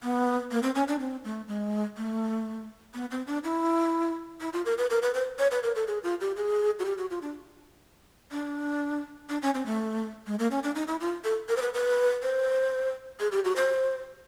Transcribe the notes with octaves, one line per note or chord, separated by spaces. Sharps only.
B3
A#3
C4
C#4
D4
C4
A3
G#3
A3
B3
C4
D4
E4
E4
F4
A#4
B4
A#4
B4
C5
C#5
B4
A#4
A4
G#4
F4
G4
G#4
F#4
G4
F#4
F4
D4
D4
D4
C#4
C4
A3
G#3
A#3
C#4
D4
D#4
E4
F4
A4
A#4
C5
B4
B4
C5
G#4
G4
F#4
C5